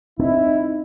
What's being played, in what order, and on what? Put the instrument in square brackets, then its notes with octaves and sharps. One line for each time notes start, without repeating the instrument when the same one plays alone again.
[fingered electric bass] C4 [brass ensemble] D#4 E4